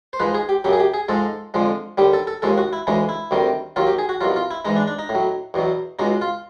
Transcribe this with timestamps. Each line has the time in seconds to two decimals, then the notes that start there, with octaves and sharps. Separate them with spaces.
0.13 C5
0.20 G#2 F3 G#3 B4
0.34 G#4
0.49 G4
0.64 F#2 C#3 F#3 G4
0.73 G#4
0.80 G4
0.94 G#4
1.09 G#2 F3 G#3 A4
1.54 F2 D3 F3 G#3
1.98 D#2 D3 G3 G4
2.13 A4
2.27 A4
2.42 D#2 C#3 F3 G#3 A4
2.58 F#4
2.73 E4
2.87 D2 C#3 E3 G#3 D#4
3.09 E4
3.31 D2 C3 D#3 G3
3.76 D#2 D#3 F#3 F4
3.87 G4
3.98 G#4
4.09 F#4
4.21 C2 B2 F#3 F4
4.36 F4
4.51 E4
4.65 G#2 E3 G#3 D#4
4.76 D4
4.87 D4
4.99 D#4
5.09 A2
5.15 F#3
5.54 E2 B2 F#3
5.99 C#2 B2 G#3 D#4
6.21 F4